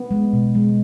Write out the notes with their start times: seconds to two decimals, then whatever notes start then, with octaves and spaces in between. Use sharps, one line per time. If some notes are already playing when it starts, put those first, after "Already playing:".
Already playing: B3
0.11 G#3
0.33 B2
0.55 G#3